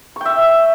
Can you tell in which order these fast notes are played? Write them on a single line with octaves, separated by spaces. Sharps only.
C#6 G5 E5